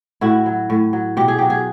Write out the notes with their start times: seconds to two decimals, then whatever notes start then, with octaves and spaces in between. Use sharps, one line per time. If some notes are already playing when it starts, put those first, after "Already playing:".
0.21 A2 E4 F#4
0.46 F#3
0.70 A2
0.93 F#3
1.17 B2 G4
1.28 G#4
1.38 F#3 G4
1.50 G#4